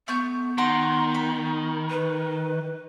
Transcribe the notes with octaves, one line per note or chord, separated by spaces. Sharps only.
A3 B3 C#6 G6
D#3 F#5 A#5 C6
B5
B4